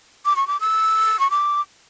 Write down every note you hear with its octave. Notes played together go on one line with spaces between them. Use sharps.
D6
C#6
D6
E6
C#6
D6